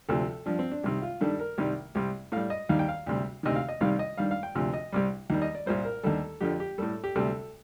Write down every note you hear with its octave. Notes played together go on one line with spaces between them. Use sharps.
D2 C3 F3 A4
G2 F3 D4
C4
D4
C2 C3 D#3
F4
G2 D#3 G3 A4
A#4
C2 C3 D#3 G3
C2 C3 G3
A2 G3 F5
D#5
D#2 D#3 G3 F5
G5
F5
D2 C3 G3
D2 C3 D#3 D#5
F5
D#5
C2 C3 D#3 G3 F5
D#5
G2 D#3 G3 F5
F5
G5
D2 C3 F3
D#5
C2 C3 G3
D#2 D#3 G3
D#5
D5
C2 A#2 G3 C5
A#4
D#2 D3 G3 A4
F2 D3 F3 G4
G4
A2 G3 A4
G4
D2 C3 G3 A4